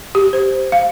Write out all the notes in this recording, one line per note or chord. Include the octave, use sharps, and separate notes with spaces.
G4
C5
F5